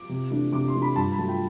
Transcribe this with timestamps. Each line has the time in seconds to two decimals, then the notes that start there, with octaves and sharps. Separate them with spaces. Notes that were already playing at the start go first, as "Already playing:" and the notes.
Already playing: D6
0.09 C3
0.31 E3 A3 D4
0.53 C3 D6
0.68 C6
0.75 E3 A3 D4
0.82 B5
0.96 G2 A5
1.12 B5
1.18 F#3 A3 A5
1.28 G5